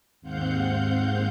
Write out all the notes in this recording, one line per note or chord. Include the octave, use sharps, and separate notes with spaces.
D#2 G#2 C4 F5 F#5 G6